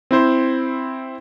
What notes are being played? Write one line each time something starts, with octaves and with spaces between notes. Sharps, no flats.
C4 E4 C5